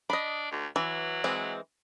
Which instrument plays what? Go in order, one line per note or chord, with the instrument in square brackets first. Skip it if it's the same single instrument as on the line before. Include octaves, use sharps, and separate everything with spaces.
[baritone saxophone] D4 [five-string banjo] D#5 B5
[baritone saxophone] D2
[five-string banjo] E3 [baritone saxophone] F#3
[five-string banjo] E3 G#3 C4